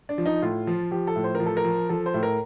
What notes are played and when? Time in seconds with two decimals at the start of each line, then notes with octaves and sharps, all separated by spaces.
0.09 D4
0.18 F3
0.26 D#4
0.42 A2 F4
0.67 F3
0.91 F3 G4
1.07 A4
1.16 A2
1.24 C5
1.35 A#4
1.40 F3
1.46 A4
1.57 A#4
1.65 F3
1.89 F3 A4
2.06 C5
2.14 A2
2.23 A#4